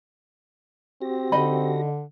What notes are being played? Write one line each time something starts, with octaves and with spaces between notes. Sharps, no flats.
C4 F#4 G4 A#6
D3 D#4 D#5 B5